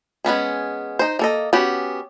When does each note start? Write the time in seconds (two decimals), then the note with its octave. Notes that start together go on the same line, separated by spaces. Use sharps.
0.25 G#3 B3 C#4 G#4
0.99 D#4 C5
1.19 A#3 A4 D#5
1.53 B3 C#4 F#4 G4